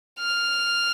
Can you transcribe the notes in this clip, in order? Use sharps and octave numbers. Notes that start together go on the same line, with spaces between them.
F6